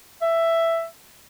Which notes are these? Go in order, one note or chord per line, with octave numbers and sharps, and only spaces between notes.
E5